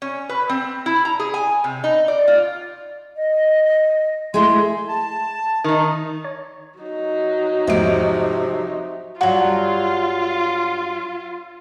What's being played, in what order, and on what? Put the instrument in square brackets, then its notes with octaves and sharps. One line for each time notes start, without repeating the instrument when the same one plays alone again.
[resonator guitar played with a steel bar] C#4
B4
C4
E4
A#5
G#4
G#5
C3
D#4
D5
F4
[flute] D#5
[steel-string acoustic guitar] G#3 A3 E4 [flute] C6
[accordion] A5
[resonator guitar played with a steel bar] D#3 D#4
[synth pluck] C#5
[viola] F#3 D#4
[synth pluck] E2 A3 D7 [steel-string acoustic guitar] G#2 F3 [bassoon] C3
[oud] G2 F#3 [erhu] F4 [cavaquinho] F#4